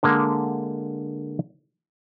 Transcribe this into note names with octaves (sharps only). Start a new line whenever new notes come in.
D3 G#3 A#3